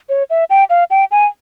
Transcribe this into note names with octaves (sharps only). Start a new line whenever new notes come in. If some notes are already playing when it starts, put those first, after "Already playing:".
C#5
E5
G5
F5
G5
G#5